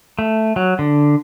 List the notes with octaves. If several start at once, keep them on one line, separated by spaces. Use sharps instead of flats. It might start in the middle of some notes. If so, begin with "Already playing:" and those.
A3
F#3
D3